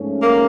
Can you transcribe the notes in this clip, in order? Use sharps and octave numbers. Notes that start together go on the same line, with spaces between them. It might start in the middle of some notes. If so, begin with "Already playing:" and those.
Already playing: G#2 F3 A3 C#4
A#3